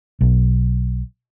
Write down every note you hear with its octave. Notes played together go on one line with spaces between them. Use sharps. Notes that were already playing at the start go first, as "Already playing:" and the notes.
B1